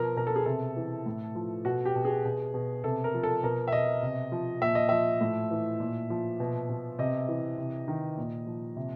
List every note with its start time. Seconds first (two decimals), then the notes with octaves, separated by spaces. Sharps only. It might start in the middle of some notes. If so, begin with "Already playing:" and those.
Already playing: B2 F3 A#4
0.16 B2 A#4
0.27 A4
0.36 G#4
0.46 C3 A4
0.77 E3
1.06 A2
1.35 F3
1.65 B2 F#4
1.85 G4
1.95 B2
2.05 G#4
2.25 B2
2.54 B2
2.84 C3 A4
3.04 A#4
3.14 F3
3.23 A4
3.43 B2 A#4
3.68 E5
3.72 B2 D#5
4.03 C3
4.32 F3
4.62 A#2 E5
4.75 D#5
4.89 F3 E5
5.21 A2
5.51 E3
5.80 A#2
6.10 F3
6.40 B2
6.69 B2
6.99 C3 D#5
7.28 E3
7.58 C3
7.88 D#3
8.18 A#2
8.47 F3
8.76 C3